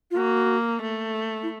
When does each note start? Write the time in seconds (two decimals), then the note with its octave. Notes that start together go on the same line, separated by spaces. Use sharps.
0.11 F4
0.17 A#3 F#4
0.82 A3
1.43 E4